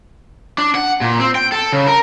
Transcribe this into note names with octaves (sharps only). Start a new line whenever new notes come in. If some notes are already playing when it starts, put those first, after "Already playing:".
D4
F#5
A#2
C4
G5
A4
C#3
A#4